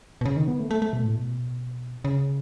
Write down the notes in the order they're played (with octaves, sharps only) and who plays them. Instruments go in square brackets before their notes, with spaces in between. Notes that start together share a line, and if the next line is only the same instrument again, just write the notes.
[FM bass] B2
C#3
D#3
B3
A3
A3
A3
B2
A2
B2
C#3